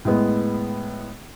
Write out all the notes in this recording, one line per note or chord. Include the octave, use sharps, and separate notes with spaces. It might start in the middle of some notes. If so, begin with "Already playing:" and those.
A2 G#3 B3